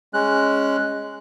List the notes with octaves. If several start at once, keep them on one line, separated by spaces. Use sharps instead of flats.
G#3 C#4 F#6